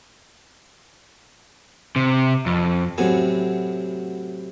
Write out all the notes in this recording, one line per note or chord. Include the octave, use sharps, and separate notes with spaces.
C3
F2
A2 C3 F#3 G#5